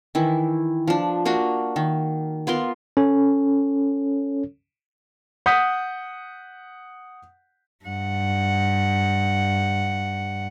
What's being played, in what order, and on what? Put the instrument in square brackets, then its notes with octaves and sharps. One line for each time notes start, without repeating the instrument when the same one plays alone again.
[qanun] D#3 E3 E4
F3 D4
A#3 D4 F#4
D#3
B3 F4 A#4 C6
[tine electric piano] C#4 A4 C#5
[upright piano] F#5 D#6 G6 B6
[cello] G2 F#5